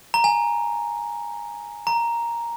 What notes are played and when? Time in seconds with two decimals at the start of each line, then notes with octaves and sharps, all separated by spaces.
0.14 A#5
0.24 G#5
1.87 A#5